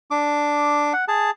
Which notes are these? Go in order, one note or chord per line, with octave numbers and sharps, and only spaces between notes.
D4 D6
F#5
G#4 A5